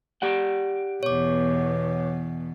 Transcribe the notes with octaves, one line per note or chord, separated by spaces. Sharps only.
G4 D5 F#5
E2 B2 C#5 D6